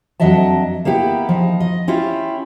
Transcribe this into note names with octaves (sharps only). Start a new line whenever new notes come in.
F2 F#3 D4 D#5 E5 A5
A#3 B3 E4 G4
F3 D#4
D#5
C#4 E4 F4 G4